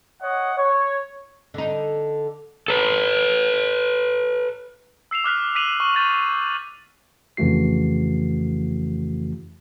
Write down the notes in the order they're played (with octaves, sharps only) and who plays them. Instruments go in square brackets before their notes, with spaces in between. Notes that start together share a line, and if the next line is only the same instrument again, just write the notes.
[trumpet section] C#5 D#5 F#5
C#5
[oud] D3 D#4
[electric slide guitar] A4 B4
[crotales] E6 C7 E7 F7
D6 F6 F#6 B6
D6 B6 D#7 F7 F#7
C#6 F#7
C#6 F6 G6 A6
[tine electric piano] F2 C#3 E3 A3 F#4 C7